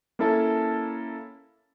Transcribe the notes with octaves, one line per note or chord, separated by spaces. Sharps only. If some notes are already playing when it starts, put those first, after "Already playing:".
A#3 C#4 E4 A4 E5 A5